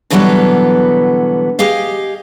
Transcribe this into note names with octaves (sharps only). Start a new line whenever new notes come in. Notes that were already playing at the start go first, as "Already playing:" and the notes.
B2 D3 E3 F#3 G3 B3
G4 G#4 D#5 F5